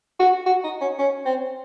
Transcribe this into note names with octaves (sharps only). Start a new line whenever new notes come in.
F#4
F#4
D#4
C#4
C#4
C4